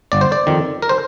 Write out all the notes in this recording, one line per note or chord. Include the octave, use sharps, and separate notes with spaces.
G1 D5
C5
D5
F2 D#3
A#4
C5